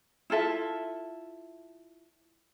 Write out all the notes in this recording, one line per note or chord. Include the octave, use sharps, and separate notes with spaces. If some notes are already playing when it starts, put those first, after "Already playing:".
E4 F4 A4 E5